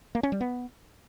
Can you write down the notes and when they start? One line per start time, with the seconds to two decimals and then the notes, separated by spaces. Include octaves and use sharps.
0.15 A#3
0.23 C#4
0.32 G3
0.41 B3